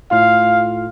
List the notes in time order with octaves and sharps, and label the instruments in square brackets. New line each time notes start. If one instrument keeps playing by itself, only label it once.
[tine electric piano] A2 F4 [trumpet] F5